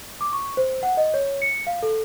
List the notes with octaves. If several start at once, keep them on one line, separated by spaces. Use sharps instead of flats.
D6
C#6
C5
F#5
D#5
C#5
C#7
F5
A4